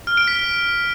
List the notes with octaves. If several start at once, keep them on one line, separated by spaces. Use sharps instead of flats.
F6
D7
B6